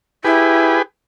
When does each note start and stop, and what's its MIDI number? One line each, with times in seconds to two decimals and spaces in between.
0.25 0.78 64
0.25 0.82 67
0.25 0.82 68
0.25 0.82 71